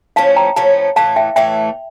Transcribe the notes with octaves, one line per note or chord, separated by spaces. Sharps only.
A2 F3 A3 C#4 F5 A5
G5 A#5
A2 F3 A3 C#4 F5 A5
A2 E3 A3 F5 A5
E5 G5
A2 E3 A3 E5 G5